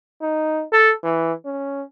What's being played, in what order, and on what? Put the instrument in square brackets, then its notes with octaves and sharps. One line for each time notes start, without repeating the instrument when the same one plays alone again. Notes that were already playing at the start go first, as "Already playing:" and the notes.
[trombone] D#4
A4
E3
C#4